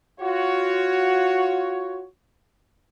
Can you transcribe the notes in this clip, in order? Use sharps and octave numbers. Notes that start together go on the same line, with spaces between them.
F4 F#4 C#5